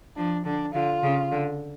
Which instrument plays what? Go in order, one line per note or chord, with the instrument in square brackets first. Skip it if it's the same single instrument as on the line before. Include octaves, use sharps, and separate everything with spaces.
[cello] F3 [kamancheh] D4
[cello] D3 [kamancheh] D4
[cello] D3 [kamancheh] F4
[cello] C#3
D3